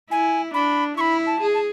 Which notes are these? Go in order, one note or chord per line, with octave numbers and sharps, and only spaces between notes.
E4 G#5
D4 B5
E4 B5 C#6
A5
G#4
A5